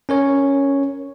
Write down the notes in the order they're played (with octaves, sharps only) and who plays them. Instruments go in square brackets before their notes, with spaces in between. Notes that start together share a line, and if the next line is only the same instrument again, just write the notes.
[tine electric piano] C#4 A#4 C#5